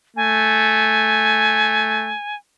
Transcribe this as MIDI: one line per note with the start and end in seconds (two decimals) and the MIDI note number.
0.17 2.15 57
0.17 2.36 80